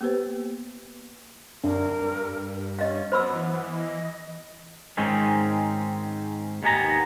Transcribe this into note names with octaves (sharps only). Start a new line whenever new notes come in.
A#3 B3 G4 B4 C5
F#2 D4 A#4
G2
C#4 D#5 F5
F#3 B3 C5 B5 E6
E3
D#5
G#2 D#3 G#3 C4 C#4 D#4
D#2 D#3 B3 G#5 A#5